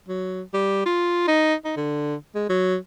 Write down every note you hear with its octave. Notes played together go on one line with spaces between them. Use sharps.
F#3
G3
F4
D#4
D#4
D3
G#3
F#3